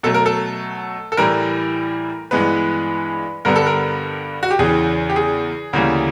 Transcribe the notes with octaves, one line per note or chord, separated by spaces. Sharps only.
B2 F#3 A3 A4
A#4
A4
A4
A2 E3 G3 A#4
G2 E3 G#3 B3 B4
G2 D3 G3 B3 A#4
A4
A#4
F#4
G4
E2 C#3 E3 G#4
G4
G#4
D2 C#3 E3 G3 A#3